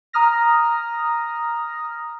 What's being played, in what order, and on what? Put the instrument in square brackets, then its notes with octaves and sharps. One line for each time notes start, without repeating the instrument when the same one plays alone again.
[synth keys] A#5 D#6 F6 A#6